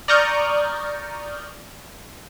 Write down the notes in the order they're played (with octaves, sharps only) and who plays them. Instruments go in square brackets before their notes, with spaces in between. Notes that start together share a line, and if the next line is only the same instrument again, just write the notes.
[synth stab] D5 A#5 C#6 D#6 F6 G6